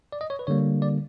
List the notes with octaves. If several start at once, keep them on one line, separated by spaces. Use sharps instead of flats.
D5
D#5
C#5
B4
D3 G3 A#3 C#5
D5